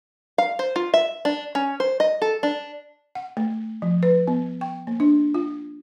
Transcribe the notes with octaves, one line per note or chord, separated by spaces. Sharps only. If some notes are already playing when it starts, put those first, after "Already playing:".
F5
C5
F4
E5
D4
C#4
C5
D#5
A4
D4
F#5
A3
F3
B4
B3
G5
A#3
D4
F4